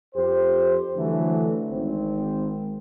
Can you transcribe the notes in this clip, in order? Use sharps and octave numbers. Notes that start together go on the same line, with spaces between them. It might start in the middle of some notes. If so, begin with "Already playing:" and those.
F2 G4 C5
D3 E3 F#3 A3
G#1 C4